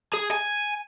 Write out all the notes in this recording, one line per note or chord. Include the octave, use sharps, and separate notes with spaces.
G#4
G#5